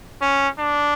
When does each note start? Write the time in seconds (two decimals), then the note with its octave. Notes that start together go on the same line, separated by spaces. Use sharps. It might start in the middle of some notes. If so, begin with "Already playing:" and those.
0.22 C#4
0.59 D4